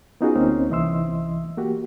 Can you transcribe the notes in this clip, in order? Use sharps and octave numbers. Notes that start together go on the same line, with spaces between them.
B3 C#4 D#4 F4 F#4 G#4
D2 A#3 C4 C#4 D#4 C5
C2 E3 D#5 E5 C6 E6
A#3 F#4 G4